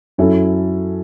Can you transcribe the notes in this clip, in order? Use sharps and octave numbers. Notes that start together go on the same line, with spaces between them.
F#2 F#3 C#4 E4 A4